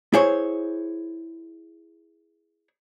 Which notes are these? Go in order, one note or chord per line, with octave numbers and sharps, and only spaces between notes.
E4 G#4 C5 C#5